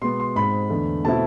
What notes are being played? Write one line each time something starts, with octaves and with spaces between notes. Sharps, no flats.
B2 G#3 B3 C6
C6
G#2 G#3 C4 B5
E2 D3 A3
B2 A3 C4 E4 A5